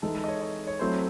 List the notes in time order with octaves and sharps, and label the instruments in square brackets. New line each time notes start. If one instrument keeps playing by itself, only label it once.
[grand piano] E3 G#3 D#4 [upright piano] A4
[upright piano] A4
D#5
C#5
C#5
C#5
[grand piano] F#3 A3 C4 E4 [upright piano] C5